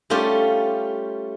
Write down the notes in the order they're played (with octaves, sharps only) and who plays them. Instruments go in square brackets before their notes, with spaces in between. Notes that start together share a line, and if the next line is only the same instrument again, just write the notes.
[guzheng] G3 A3 C#4 F4 G4